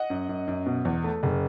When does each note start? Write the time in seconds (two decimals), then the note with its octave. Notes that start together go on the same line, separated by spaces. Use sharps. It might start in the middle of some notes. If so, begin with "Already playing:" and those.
Already playing: D#5 F#5
0.10 F#2
0.29 F#2
0.47 F#2
0.66 B2
0.85 E2
1.04 A3
1.23 F#1